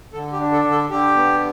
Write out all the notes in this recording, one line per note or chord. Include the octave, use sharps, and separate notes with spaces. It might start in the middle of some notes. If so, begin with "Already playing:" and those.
D3 A4
G4
D4
A4
D3
A4
D3 G4
B3